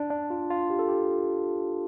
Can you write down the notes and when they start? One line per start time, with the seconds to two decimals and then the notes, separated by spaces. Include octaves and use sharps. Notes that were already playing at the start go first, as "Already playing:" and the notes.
Already playing: D4
0.10 D4
0.30 F4
0.50 F4
0.70 G4
0.79 A4
0.88 G4